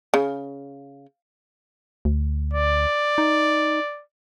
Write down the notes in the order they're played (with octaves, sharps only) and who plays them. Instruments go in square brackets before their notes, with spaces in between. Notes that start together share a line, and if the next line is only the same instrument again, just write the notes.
[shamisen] C#3
[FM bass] D2
[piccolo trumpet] D5
[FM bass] D#4